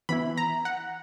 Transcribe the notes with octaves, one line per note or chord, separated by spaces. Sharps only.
E3 B3 E4 B5
A#5
F#5